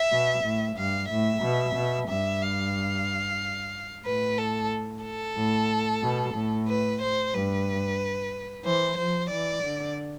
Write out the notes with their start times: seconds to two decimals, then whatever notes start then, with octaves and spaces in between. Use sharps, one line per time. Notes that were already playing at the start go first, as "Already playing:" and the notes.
Already playing: E5
0.12 B2
0.44 A2
0.77 G2 F5
1.10 A2 E5
1.43 B2
1.75 B2
2.09 G2 E5
2.42 F5
4.05 A2 B4
4.38 A4
5.04 A4
5.37 A2
6.02 B2
6.35 A2
6.68 B4
7.01 C5
7.34 G2 B4
8.65 E3 C5
8.97 F3 C5
9.30 E3 D5
9.63 D3